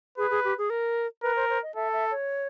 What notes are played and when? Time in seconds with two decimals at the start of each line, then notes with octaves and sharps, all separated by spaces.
0.18 G#4 B4
0.31 G#4
0.44 G4
0.58 G#4
0.70 A#4
1.23 A#4 B4
1.36 C5
1.50 C5
1.63 D#5
1.75 A4 E5
1.93 E5
2.11 C#5